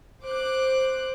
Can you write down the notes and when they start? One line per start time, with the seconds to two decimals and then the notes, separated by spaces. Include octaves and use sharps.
0.23 C5 D6 F#6